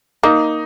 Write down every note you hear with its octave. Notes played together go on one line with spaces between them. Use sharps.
A#3 D#4